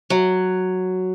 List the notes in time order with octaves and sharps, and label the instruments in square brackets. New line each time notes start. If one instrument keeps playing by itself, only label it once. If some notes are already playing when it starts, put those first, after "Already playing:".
[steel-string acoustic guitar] F#3